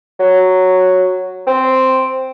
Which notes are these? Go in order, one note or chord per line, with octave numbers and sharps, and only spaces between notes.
F#3
C4